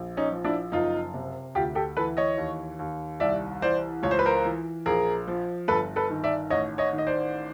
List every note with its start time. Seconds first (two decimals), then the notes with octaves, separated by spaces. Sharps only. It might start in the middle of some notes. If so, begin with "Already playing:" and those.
Already playing: A#1
0.17 C#4 D#4
0.32 F3
0.44 D4 E4
0.72 F#1 D#4 F4
1.14 C3
1.55 D2 F4 G4
1.75 G4 A4
1.97 E3 A4 B4
2.17 C#5 D#5
2.38 D#2
2.79 D#2
3.20 C2 D5 E5
3.62 E3 C5 D5
4.03 C#2 C#5
4.11 C5
4.19 B4
4.25 A#4 C5
4.45 E3
4.86 A#1 G#4 A#4
5.28 F3
5.68 G1 A4 B4
5.96 A4 B4
6.10 D#3
6.24 D5 E5
6.50 A1 C#5 D#5
6.78 C#5 D#5
6.93 D#3
6.98 D#5
7.07 C5 D5